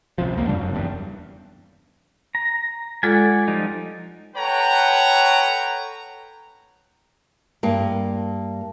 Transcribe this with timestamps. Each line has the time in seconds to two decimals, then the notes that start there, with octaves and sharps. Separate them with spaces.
0.18 C#2 C3 F3
0.34 F2 A#3
0.47 F#2 C#3 G3 D4
0.60 F1 F#2
0.75 E2 G2
2.35 A#5
3.03 G#3 F4 A4 D5 F#5 G#5
3.48 F3 G3 D#4
4.36 A4 B4 C#5 F#5 G5 A#5
7.63 G2 A#3